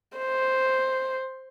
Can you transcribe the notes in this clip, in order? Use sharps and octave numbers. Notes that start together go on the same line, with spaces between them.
C5